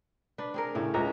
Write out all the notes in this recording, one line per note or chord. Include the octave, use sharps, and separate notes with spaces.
D4 B4
C4 G#4 A#4
A2 C#3 C#4
C#2 A#5